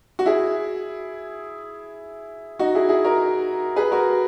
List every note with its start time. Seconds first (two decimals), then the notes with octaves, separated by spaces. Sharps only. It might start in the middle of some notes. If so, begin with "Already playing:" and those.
0.19 F#4
0.26 E4 G#4
2.59 D#4 F#4
2.75 E4 G#4
2.89 E4 G#4
3.04 F#4 A#4
3.76 G#4 B4
3.91 F#4 A#4